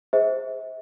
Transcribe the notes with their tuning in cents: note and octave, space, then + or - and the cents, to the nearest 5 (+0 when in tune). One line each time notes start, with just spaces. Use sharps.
G#4 +0 C5 +0 E5 -40